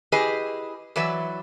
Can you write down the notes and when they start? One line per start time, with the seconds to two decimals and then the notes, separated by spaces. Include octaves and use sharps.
0.12 E4 G4 G#4 B4 D#5
0.96 E3 F#3 B4 D5 E5